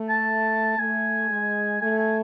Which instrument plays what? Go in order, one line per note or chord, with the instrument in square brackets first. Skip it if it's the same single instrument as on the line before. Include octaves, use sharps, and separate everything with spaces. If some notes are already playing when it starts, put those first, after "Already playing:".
Already playing: [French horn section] A3
[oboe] A5
[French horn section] A3 [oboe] G#5
[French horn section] G#3
[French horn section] A3 [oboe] G#5
[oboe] G#5